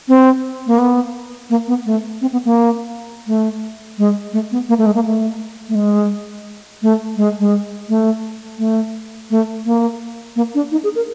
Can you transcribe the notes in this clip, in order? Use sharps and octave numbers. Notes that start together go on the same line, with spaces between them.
C4
A#3
B3
A#3
B3
A3
C4
B3
A#3
A3
G#3
A3
B3
A#3
A3
G#3
A#3
A3
A3
G#3
A3
G#3
G#3
A3
A3
A3
A#3
A#3
D4
D#4
G#4
A#4